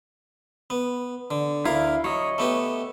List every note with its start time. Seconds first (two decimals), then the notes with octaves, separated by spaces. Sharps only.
0.70 B3
1.31 D3
1.65 D2 E4 A#4 F5
2.04 F#3 C#5 D#5
2.38 A3 B3 G4